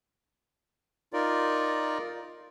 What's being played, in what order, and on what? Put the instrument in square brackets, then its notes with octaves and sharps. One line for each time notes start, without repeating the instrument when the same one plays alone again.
[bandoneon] D#4 F4 A#4 D5